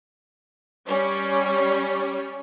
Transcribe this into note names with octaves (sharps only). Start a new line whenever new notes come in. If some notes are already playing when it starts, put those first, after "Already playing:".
G3 C#4